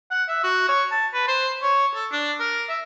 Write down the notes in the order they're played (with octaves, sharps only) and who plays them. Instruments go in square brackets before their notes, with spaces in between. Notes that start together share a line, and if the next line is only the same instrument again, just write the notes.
[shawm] F#5
E5
F#4
C#5
A5
B4
C5
C#5
A4
D4
A#4
E5